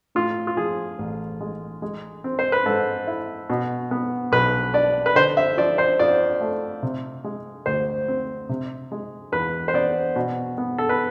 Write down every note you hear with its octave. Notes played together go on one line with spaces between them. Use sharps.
A2 F4
F4
F3 G#4
A1
G#3
G#3
C4
C5
B4
G#2 A4
E4
B2
B3
B1 B4
D4 D5
B4
D3 C5
E5
F3 D5
C5
F2 D5
A3
C3
G#3
D2 C5
C4
C3
G#3
E2 B4
C5
B3 D5
B2
B3
A4
B4